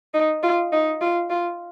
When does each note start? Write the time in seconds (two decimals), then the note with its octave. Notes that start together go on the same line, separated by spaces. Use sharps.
0.14 D#4
0.43 F4
0.72 D#4
1.01 F4
1.30 F4